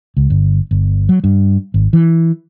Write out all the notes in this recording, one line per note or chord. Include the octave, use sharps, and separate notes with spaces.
C#2
G1
G1
F#3
G2
G#1
E3